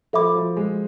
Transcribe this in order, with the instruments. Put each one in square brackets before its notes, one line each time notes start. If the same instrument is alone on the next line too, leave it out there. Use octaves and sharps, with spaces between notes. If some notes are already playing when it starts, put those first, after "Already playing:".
[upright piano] F3 [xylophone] A4 E5 B5 D6
[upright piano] F3
G#3